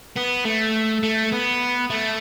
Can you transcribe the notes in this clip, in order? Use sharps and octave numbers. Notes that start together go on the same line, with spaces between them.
B3
A3
A3
B3
A3